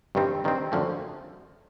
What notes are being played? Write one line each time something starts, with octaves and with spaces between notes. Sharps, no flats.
G2 D#3 G3 C4
G2 D#3 G3 C4
F#2 D3 F3 A3 C#4